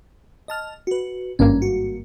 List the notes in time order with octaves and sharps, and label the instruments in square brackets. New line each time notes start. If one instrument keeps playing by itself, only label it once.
[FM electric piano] D#5 A5 F6
F#4 B4
[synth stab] G#1 G2 A#3 [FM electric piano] C#4
[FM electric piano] F#4